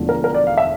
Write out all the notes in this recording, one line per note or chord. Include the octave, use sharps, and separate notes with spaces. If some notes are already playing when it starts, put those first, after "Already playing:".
Already playing: E1 E2 D3 F3 A3
A#4
A#4
D5
F5
E5